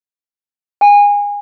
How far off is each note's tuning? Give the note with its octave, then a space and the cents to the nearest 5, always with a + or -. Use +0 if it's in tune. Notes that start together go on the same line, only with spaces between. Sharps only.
G#5 -25